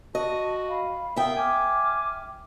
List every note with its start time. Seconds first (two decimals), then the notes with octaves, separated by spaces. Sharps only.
0.15 F#4 D#5 A5
0.68 F5 B5
1.16 B3 A#4 E5 F5 G5 D#6
1.37 G#5 D6 F6